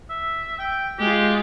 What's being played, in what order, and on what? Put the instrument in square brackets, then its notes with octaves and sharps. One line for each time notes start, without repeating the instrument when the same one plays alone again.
[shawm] E5
G5
[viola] G#3 F4 [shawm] G4